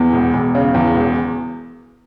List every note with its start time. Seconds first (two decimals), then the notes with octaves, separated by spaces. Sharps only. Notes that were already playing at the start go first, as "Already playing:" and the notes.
Already playing: E2 B3
0.13 E1
0.33 E1
0.55 C#3
0.74 E2
0.95 E1